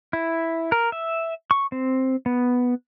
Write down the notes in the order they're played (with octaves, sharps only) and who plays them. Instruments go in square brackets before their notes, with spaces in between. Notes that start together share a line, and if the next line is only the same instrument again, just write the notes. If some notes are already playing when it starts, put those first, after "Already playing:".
[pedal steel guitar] E4
A#4
E5
C#6
C4
B3